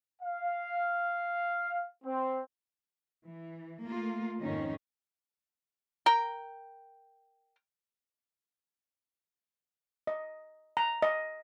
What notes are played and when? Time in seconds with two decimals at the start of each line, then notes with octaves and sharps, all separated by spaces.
0.22 F5
2.04 C4
3.28 E3
3.83 A3 A#3 F4
4.41 F2 G#2 D#3 C#4 D#4
6.06 A#4 G5
10.07 D#5
10.77 A#5
11.02 D#5